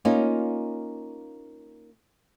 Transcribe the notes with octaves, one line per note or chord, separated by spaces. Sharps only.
A#3 C#4 D#4 F4